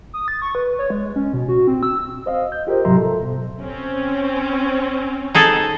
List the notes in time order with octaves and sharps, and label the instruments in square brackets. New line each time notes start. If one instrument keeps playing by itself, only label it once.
[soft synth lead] D#6
A6
C#6
B4
C#5
G#3
C#4
B2
F#4
C4
E6
[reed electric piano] C5 D#5 F5
G6
F4 G4 A#4 C5 D#5
G#2 C3 F#3 E5 A#5 C6
A4
B2
[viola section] C4 C#4
[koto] D#4 G#4 A4